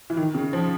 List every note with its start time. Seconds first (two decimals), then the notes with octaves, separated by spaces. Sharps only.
0.10 E3
0.17 D#3
0.35 C#3
0.53 F3